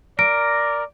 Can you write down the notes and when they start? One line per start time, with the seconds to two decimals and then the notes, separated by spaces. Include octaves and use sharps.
0.19 A#4 D5 D7